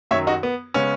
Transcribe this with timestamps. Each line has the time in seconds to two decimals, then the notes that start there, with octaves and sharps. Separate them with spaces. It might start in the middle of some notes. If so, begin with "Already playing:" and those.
0.11 F#2 D#3 F#3 C#5 E5
0.27 D#4 F#4
0.43 B3
0.74 C#3 G#3 B3 C#4